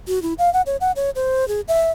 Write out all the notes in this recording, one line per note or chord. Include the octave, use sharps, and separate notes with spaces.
F#4
E4
F5
F#5
C#5
F#5
C#5
C5
G#4
E5